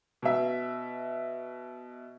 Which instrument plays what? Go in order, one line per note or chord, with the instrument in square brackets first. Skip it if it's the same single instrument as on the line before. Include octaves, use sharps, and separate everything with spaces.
[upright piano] B2 E5